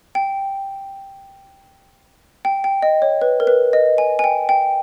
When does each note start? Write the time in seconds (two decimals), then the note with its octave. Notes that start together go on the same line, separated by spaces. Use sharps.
0.15 G5
2.45 G5
2.64 G5
2.82 D#5
3.02 C#5
3.22 B4
3.40 A#4
3.47 B4
3.73 D#5
3.98 G#5
4.19 G#5
4.24 G5
4.49 G5